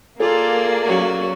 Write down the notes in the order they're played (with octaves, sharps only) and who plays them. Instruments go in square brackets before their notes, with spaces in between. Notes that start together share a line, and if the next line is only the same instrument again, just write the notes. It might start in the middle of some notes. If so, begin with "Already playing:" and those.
[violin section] A#3 [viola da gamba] F4 [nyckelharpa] G#4 D5 [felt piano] A4
[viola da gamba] F#3 C#4 F#4